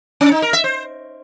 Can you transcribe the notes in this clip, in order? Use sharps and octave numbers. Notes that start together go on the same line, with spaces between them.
C#4
D#4
A#4
E5
C5